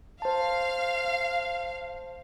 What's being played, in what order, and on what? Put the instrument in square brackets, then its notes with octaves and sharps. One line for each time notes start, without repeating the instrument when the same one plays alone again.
[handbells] C5 A5 [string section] F5